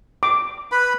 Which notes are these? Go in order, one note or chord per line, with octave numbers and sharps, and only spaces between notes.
D6
B4 B5